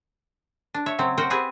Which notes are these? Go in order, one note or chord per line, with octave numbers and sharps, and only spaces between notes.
D4
C#5 E5
C#3 F#3 C4
F#4 A#4 C5 F#5 G5
C4 G4 G#4 B4